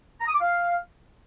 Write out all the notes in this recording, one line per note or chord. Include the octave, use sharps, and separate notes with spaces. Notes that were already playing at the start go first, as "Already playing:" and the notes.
A#5
D#6
D6
F5